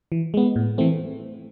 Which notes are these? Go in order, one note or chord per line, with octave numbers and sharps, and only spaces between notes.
E3
G#3 B3
A2
E3 A3 C4